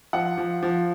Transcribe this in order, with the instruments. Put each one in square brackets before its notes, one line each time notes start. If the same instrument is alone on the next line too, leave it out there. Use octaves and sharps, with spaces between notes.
[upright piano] F3 F#5
F3
F3